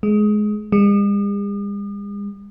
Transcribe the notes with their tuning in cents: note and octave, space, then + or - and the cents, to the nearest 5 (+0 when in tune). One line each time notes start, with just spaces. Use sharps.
G#3 +20
G#3 -45